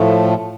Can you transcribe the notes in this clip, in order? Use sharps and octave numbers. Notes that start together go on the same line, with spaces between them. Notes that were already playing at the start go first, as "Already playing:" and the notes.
Already playing: A2 F3 A3